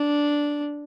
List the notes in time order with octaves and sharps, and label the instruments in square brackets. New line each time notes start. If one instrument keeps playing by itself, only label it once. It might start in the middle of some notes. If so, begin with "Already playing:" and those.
Already playing: [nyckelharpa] D4